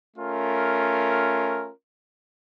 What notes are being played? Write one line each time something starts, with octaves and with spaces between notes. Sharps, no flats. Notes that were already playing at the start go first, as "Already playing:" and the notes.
A3 C#4 F4 A#4